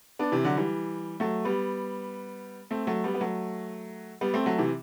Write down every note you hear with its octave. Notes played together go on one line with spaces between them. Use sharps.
B3 D4
C3 E3
D3 F#3
E3 G3
F#3 A3
G3 B3
A3 C4
F#3 A3
G3 B3
B3
F#3 A3
G3 B3
A3 C4
F#3 A3
C3 E3